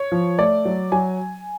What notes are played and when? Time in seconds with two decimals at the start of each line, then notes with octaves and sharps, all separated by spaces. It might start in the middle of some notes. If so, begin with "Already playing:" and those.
Already playing: C#5
0.12 F3
0.39 A3 D5
0.65 F#3
0.92 F#3 G#5